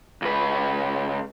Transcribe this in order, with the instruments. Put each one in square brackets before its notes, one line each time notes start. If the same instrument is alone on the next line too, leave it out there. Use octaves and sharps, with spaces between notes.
[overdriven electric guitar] C#2 B4